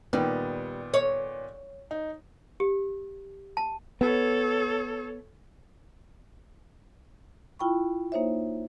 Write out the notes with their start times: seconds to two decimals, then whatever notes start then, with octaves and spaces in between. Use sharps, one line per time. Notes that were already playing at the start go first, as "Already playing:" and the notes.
0.13 A#2 D#3 G3 B3
0.94 C#5
1.91 D#4
2.60 G4
3.57 A5
4.01 B3 A4 C#5
7.59 E4 F4 G5 B5 C#6
8.12 A#3 D#4 C5 C#5 E5